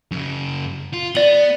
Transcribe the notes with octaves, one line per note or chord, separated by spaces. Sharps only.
F#2 C#3
F4
B3 D5 F#7